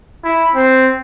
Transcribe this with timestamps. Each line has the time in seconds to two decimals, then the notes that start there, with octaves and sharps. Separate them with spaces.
0.24 E4
0.55 C4